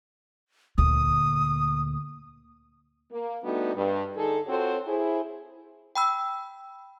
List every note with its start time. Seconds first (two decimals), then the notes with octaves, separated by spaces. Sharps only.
0.78 D2 A#2 D#6
3.12 A#3
3.44 G3 A3 B3 D4 D#4 F#4
3.75 G2
4.17 D3 D#4 G#4 A4
4.47 C4 F4 F#4 A4 C5 C#5
4.87 E4 G#4 C5
5.95 G5 B5 E6